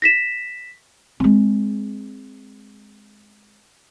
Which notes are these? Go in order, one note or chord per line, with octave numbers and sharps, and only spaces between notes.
A#6 B6 E7
G#3 C4